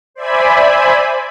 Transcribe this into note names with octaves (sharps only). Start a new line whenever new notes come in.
C5 D5 E5 G#5 B5